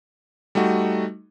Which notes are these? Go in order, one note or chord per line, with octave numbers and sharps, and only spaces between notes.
G3 A3 D#4 F#4